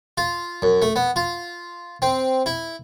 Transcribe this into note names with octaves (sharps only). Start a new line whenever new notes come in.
F4
F#2
A3
B3
F4
C4
E4